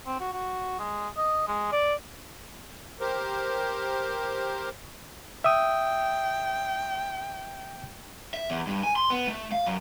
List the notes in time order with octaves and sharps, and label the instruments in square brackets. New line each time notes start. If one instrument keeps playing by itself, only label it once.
[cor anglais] C4
F#4
F#4
G#3
D#5
G#3
D5
[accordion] G4 A#4 C5
[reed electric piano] E5 D#6 [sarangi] G5
[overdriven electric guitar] E5
E2
G2
G#5
C6
B3
A3
F5
F#2